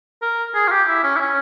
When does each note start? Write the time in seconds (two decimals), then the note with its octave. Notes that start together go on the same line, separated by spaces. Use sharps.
0.22 A#4
0.54 G#4
0.67 F4
0.71 G4
0.88 E4
1.04 C#4
1.16 E4
1.20 C#4